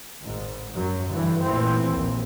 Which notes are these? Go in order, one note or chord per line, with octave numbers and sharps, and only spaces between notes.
G#1 G#2
F#2 F#3
G2 D3 E3
A1 A#2 E3 C4
A#1 D#2